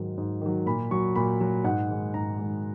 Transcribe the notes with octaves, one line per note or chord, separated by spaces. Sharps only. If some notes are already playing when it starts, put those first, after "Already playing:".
Already playing: G#2 D#3 F#3
G#2
D#3 F#3
A#2 B5
F#3 C#6
A#2 B5
F#3
G#2 F#5
D#3 G#3
G#2 A#5
D#3 G#3